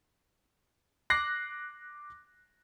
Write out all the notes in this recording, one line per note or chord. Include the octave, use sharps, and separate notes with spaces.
D6 F#6 A#6 C7